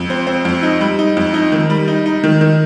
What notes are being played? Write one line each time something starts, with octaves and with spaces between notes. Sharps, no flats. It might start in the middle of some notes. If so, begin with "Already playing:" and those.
Already playing: F2
C4
C4
F2
D#4
G3
D#4
F2
D#4
D#3
G3
D#4
D#4
D#3
D#3